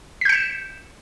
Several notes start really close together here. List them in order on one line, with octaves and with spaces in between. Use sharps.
B6 G6 C#7 E7